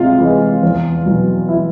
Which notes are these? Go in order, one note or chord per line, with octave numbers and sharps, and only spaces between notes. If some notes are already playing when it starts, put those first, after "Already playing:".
Already playing: C3 G#3 F4 F5
E3 G#3
E2
B2 F#3
E4 E5